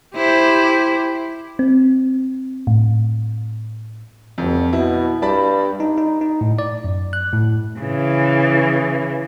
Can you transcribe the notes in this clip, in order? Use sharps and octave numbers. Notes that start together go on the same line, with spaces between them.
E4 G4 C5
C4
A2
F#1 F2
B2 E4
G2 D5 A5 B5
D#4
D#4
D#4
A2
D5
F#2
F#6
A2
C#3 E3